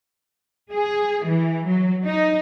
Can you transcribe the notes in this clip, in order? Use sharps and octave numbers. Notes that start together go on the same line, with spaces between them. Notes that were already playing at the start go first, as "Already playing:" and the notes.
G#4
E3
F#3
D#4